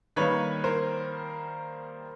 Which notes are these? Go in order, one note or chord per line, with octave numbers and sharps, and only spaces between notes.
D#3 G3 A#3 B4 C#5
A#4 C5